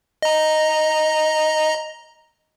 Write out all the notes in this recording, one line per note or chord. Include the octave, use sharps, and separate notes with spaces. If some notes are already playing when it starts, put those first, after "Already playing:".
D#5 A#5